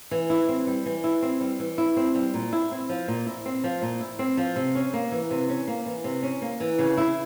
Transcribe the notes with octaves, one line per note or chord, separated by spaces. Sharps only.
E3
E4
C4
G3
E3
E4
C4
G3
E3
E4
C4
G3
A#2
E4
C4
F3
A#2
E4
C4
F3
A#2
E4
C4
F3
C3
C#4
A#3
E3
C3
C#4
A#3
E3
C3
C#4
A#3
E3
C#3
E4